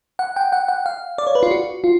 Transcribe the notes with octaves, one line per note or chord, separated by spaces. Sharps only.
F#5
G5
F#5
F#5
F5
D5
C#5
B4
F4
F#4
F4